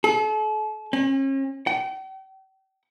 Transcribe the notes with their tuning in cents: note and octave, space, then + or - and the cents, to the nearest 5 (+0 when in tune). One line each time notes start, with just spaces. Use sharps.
A4 -40
C#4 -40
G5 -40